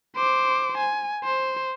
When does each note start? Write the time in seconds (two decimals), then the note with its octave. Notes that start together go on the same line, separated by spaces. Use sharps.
0.16 C5 D6
0.78 G#5
1.24 C5